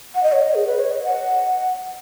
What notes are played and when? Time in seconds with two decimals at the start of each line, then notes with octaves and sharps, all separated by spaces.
0.15 F#5
0.23 D#5
0.33 C#5
0.41 D#5
0.55 G#4
0.67 B4
0.79 C#5
0.91 D#5
1.04 F#5